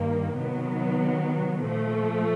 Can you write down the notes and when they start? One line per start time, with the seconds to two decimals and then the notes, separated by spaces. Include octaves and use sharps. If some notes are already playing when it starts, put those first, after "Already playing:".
Already playing: G2 D#3 G3 A#3
0.40 C3 D#3 F#3 B3
1.65 A#2 F3 A3